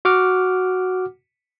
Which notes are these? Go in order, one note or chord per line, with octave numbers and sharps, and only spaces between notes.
F#4 F#5 D6 F6